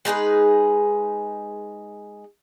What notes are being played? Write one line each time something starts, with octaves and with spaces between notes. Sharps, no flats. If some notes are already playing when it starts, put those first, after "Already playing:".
G#3 D#4 G#4 B4